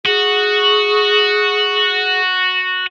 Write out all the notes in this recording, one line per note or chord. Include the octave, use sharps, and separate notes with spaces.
F#4 G#4